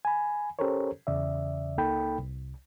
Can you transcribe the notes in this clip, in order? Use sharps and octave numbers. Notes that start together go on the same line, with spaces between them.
G#5 B5
C#4 G4 A4 A#4 C5 C#5
E2 C#3 D5 E5
C#2 A#3 D#4 A4 G5 B5
C2